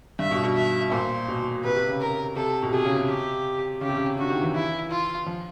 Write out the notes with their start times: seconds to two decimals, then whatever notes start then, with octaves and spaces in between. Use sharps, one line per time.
0.19 G2 E5
0.31 B2
0.43 B2
0.56 E5
0.92 A#2 C5
1.28 B2
1.64 C3 B4
1.76 C3
1.89 C#3
2.00 A#4
2.36 C3 A4
2.62 B2
2.73 C3 G#4
2.85 C#3
2.97 C3
3.09 G4
3.81 C#3 G4
3.89 C3
3.97 C#3
4.18 D3 F#4
4.30 D#3
4.41 E3
4.53 E4
4.90 F4
5.26 F3